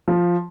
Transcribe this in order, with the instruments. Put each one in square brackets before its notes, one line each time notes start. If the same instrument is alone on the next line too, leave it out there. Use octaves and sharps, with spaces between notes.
[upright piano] F3